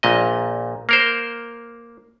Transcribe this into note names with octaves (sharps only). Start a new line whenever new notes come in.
A#1 A#2 D#5
A#3 A#4 C5